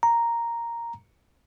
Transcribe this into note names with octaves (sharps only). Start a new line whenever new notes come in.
A#5